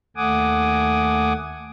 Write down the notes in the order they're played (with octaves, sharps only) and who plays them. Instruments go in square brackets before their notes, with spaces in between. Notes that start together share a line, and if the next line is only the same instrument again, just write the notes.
[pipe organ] D#2 A3 F#5 G#5 D6 D#6